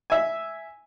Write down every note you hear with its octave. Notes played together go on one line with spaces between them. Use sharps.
E5 G#5